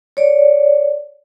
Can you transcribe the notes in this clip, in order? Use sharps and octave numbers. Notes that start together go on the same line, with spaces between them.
C#5 D5